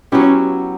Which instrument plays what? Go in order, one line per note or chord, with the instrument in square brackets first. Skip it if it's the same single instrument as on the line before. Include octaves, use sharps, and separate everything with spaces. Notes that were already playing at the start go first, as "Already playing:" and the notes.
[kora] F#3 B3 E4 G4 [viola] C#4